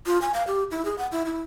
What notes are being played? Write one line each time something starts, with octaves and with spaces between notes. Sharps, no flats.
F4
G#5
F5
G4
E4
G#4
F#5
E4
E4